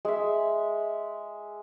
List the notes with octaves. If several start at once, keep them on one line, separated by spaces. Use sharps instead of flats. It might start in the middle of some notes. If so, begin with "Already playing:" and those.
G#3 E5